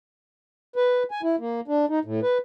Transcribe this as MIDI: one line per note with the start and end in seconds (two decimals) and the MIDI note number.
0.76 1.03 71
1.11 1.21 80
1.23 1.36 64
1.40 1.60 58
1.68 1.85 62
1.89 1.99 63
2.05 2.20 45
2.22 2.38 71